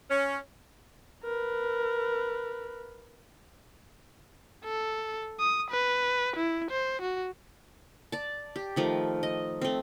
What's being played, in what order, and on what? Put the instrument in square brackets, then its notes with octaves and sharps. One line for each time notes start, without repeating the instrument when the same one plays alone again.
[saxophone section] C#4
[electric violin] A#4 B4
A4
D#6
B4
E4
C5
F#4
[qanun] D5 A5
G4
D#3 F3 A3
D#5
A3 C4